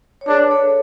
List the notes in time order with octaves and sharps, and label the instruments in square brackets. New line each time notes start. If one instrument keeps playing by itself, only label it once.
[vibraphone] C#5
[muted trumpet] D4 [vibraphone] G#4 B4
[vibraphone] A4 C#5